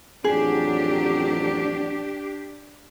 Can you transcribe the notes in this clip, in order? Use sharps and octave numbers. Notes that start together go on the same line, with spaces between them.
A1 F2 F#3 D4 G4 G#4